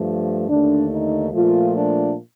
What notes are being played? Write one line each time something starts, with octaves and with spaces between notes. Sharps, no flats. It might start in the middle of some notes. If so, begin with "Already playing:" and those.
Already playing: G2 F3 A3
D#2 D3 A3 D4
D#4
A#2 F3 A3 F4
D4